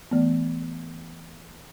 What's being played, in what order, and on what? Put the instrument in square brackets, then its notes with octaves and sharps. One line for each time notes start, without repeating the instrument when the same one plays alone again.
[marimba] E3 A3 B3